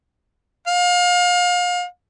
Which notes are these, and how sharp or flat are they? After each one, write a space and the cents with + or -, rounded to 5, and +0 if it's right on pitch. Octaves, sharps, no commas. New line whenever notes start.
F5 +30